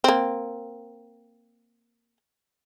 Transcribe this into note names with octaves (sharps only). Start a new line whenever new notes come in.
A#3 C4